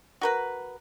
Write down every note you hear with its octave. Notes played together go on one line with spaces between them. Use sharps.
F#4 A#4 B4